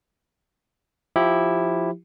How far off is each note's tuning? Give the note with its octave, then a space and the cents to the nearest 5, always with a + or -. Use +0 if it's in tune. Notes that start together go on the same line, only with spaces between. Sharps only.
F3 +0 E4 +0 G4 +0